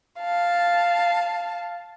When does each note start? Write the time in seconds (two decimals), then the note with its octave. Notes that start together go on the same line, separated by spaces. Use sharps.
0.20 F5 A5